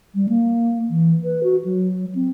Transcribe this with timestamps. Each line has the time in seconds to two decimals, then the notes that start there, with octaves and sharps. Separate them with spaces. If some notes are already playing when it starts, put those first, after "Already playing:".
0.15 G3
0.29 A#3
0.90 E3
1.24 B4
1.43 F#4
1.65 F#3
2.15 C4